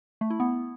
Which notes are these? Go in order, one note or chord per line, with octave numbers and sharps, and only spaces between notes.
A3
E4
B3